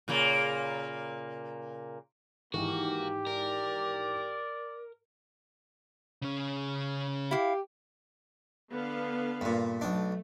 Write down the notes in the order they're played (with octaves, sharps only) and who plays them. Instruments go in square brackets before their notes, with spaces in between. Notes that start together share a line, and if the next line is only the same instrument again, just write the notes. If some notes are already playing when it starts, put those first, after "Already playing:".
[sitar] A#2 C#3 A#3
[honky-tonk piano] G#2 D#3 E3 [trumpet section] A#3 [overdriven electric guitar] F#4 [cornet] G4
[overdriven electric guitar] A#4 [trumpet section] D5
[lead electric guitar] C#3 C#4
[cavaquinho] E4 F5 [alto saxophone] G4
[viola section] D3 B3 F5
[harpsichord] G2 A#2
[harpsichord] B1 D4 [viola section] A3